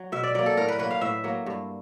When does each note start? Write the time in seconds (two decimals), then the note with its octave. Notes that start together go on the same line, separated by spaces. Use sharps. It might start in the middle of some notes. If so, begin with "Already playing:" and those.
Already playing: F#3
0.12 B2 E5
0.23 D5
0.34 F#3 A#3 D5
0.46 A4
0.57 A2 A#4
0.68 B4
0.79 F#3 A#3 B4
0.91 F5
1.01 A2 E5
1.24 F#3 A#3
1.46 G2